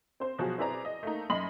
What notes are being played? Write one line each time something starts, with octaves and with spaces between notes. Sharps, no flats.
C4 C5
B2 F3 F#3 F#4 G#4
C4 E4 G#4 B4 D5 A#5
D#5
A3 A#3 D#4
F#2 D#5 B5 C6 F#7